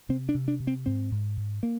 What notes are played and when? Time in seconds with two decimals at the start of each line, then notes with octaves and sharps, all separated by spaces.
0.09 C3 C4
0.29 D4
0.34 C3
0.48 D4
0.60 C3
0.67 C4
0.86 G#2 C4
1.11 G#2
1.37 G#2
1.63 A#3